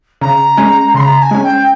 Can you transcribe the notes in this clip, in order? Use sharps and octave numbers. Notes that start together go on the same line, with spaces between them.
C#3 A#5
G#3 C#4
C#3 C6
A#5
A#5
G#5
G#3 C#4
G5